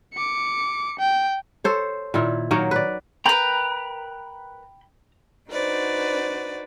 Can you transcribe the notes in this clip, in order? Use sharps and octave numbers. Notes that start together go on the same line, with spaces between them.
D6 C#7
G5
A4 C5 C#5
A#2 D#3 E4
D#3 F#3 A#3 C#5
B4 D5
A#4 B4 G5 A#5 B5 G6
D4 D#4 F#4 B4 C5 D5